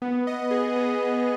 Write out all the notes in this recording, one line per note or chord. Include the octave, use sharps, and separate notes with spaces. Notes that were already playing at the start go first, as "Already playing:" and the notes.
B3
D#5
G#4
B3